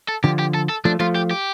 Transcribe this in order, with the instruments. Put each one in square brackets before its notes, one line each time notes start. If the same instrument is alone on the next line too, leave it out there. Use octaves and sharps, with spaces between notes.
[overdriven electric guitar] A4
[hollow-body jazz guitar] D3 F3 [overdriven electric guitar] G4
[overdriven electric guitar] G4
A4
A4
[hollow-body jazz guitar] F3 A3 [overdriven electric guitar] D4
[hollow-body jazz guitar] F3 A3 [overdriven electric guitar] F4
[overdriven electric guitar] G4
G4